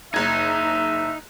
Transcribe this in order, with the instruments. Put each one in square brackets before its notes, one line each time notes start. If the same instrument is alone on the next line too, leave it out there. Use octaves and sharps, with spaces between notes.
[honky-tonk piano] F#1 G#6 [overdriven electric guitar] D#4 [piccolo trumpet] E5